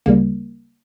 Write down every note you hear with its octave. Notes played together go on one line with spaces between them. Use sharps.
D2 C#3 G3 A#3